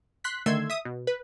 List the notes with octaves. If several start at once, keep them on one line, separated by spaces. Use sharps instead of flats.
C6 F#6 B6
D3 D#3 A3 C6 E6 G#6
E5 D#6
B2
B4